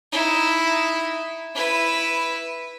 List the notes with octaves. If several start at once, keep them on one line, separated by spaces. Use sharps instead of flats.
D#4 E4
E4 B4